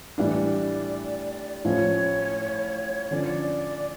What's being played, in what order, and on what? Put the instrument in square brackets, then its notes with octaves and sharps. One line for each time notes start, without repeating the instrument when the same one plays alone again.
[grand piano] A2 E3 G3 D4 [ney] D5 F5
[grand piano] A2 F3 C#4 [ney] C#5
[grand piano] D3 F3 C#4 [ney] D5